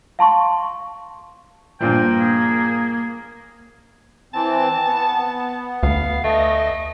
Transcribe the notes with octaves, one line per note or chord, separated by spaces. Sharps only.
F5 A5 C6 C#6
G2 A#2 F3 A#3 G5
G#4
E3 C4 A5
B3
D2 F5
A3 D#5